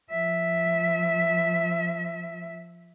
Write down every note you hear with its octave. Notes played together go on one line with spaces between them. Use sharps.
F3 E5